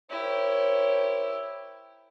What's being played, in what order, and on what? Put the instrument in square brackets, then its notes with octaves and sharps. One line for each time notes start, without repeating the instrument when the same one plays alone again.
[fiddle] E4 G4 [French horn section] A#4 C5 C#5